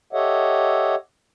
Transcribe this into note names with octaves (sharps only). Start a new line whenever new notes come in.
G4 A4 C#5 D#5 E5 F#5